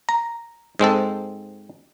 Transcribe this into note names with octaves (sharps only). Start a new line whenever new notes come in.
A#5
G#2 G#3 C4 A4